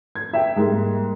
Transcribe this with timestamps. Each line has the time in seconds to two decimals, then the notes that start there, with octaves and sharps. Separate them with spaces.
0.15 G#6
0.33 E5 G5
0.56 G#2 G3 G#3 A#3